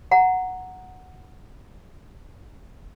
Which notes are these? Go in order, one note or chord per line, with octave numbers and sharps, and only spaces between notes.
F#5 A#5